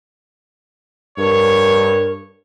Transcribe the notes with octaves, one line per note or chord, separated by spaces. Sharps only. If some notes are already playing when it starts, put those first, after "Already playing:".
G2 A#4 C#5